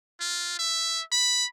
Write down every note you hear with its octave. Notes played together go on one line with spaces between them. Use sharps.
F4
E5
B5